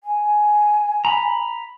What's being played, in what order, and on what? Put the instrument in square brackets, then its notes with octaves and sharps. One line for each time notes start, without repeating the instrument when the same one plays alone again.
[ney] G#5
[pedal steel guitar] A#5 B5